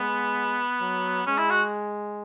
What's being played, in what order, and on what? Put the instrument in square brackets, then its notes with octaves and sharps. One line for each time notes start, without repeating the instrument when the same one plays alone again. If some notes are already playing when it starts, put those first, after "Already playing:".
Already playing: [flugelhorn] G#3 [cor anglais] B3
[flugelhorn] F#3
[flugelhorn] G#3 [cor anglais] C#4
[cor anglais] E4
F#4